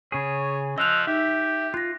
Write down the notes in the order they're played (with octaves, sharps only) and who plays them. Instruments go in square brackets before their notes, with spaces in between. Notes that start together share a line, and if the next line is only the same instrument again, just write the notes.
[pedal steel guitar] C#3 G#4 [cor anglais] C#5
[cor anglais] F3 [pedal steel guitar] D#5 F#6 [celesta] E6 F7
[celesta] D#4 [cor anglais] G4 [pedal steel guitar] E5
[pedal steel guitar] F4 [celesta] F#6 A#6